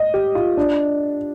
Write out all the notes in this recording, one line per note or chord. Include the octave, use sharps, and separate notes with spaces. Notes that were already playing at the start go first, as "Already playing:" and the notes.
Already playing: D#5
G4
F4
D4